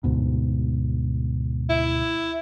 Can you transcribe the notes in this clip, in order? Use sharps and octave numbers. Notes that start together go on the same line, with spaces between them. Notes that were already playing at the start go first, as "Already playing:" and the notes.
D2 G#2 B2
E4